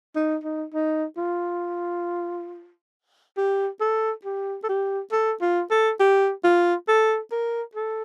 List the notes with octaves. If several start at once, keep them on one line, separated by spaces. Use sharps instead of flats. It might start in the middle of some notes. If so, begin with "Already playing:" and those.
D#4
D#4
D#4
F4
G4
A4
G4
A4
G4
A4
F4
A4
G4
F4
A4
A#4
A4